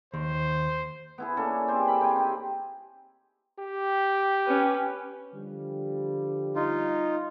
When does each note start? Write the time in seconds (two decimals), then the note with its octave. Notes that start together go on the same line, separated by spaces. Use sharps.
0.14 D#2 C5
1.18 B3 E4 G#4
1.37 A#3 C#4 D4 A4
1.68 C4 G4 G#4 C5
1.88 A#4 B5
2.01 C4 G5 G#5
2.16 D#4 G4
3.59 G4
4.46 C#4 B4
5.34 D3 F3 G3
6.56 D#4 F4